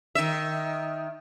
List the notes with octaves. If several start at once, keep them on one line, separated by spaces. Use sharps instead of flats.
D#3 E5